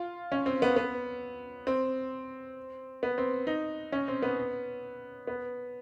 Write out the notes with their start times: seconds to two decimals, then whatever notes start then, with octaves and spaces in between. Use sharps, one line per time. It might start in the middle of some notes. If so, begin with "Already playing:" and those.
Already playing: F4
0.32 C#4
0.46 C4
0.62 B3
0.76 B3
1.67 C4
3.03 B3
3.18 C4
3.47 D#4
3.92 C#4
4.08 C4
4.22 B3
5.27 B3